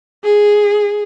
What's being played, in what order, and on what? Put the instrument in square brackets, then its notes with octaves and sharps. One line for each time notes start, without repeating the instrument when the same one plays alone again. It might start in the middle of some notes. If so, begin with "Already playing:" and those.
[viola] G#4